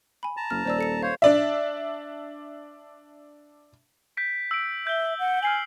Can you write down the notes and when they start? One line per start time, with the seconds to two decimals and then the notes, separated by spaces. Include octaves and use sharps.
0.23 G#5 B5
0.37 A5 A#5
0.50 F#1 F6
0.65 D#1 C5 D5 E6
0.78 A4 C#7 E7
1.03 C5 C#5 F5
1.22 D4 D5 E5
4.17 G6 B6 D7
4.51 E6 B6 D7
4.87 E5 G6 G7
5.19 F#5
5.43 G#5 F6 C7 F#7